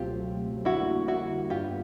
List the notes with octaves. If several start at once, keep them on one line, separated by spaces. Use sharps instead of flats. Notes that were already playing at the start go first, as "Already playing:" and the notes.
Already playing: C#2 B2 F#3 A3 C4 F4 G4
F2 D3 G3 A#3 E4 F#4
E4 F#4
G2 D3 G3 B3 F4 G4